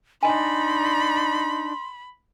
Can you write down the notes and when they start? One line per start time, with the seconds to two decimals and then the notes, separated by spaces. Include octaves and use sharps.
0.23 D4 D#4 D#5 G#5 B5 C6